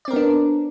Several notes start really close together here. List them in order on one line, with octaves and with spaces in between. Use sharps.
D5 C4 A#4 B3 D4